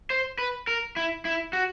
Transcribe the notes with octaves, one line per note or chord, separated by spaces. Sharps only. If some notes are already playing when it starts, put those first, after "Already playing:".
C5
B4
A#4
E4
E4
F#4